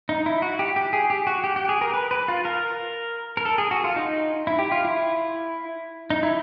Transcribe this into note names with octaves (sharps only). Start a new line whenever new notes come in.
D#4
E4
F#4
G4
G4
G#4
G4
F#4
G4
G4
G#4
A#4
B4
B4
F4
A#4
A#4
A4
G#4
F#4
F4
D#4
E4
G4
F4
E4
D#4
E4